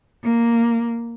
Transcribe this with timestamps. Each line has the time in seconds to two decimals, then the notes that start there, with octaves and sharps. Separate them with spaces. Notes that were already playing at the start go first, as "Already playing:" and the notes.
0.24 A#3